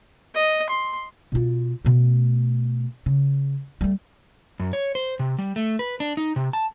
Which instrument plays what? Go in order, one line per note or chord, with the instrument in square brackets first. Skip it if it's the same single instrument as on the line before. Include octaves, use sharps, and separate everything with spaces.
[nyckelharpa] D#5
C6
[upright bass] B2 F4
B2 A3
C#3
G3 A3
[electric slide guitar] F#2
C#5
C5
C3
G3
A3
B4
D4
D#4
C3
A5